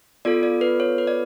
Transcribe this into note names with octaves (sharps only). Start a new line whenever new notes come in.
B3 F4 A4 D5
D5
B4
C#5
B4
D5